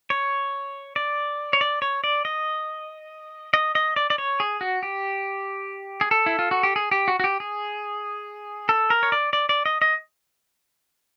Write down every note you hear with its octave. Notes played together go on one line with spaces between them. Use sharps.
C#5
D5
C#5
D5
C#5
D5
D#5
D#5
D#5
D5
D5
C#5
G#4
F#4
G4
G#4
A4
E4
F4
F#4
G4
G#4
G4
F#4
F#4
G4
G#4
A4
A#4
C#5
D5
D5
D5
D#5
D#5